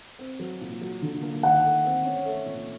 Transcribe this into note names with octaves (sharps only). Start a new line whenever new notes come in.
C4
F#3
A#2
F#3
D3
A#3
D#3 F#5
A3
C4
C#4
A3
A#2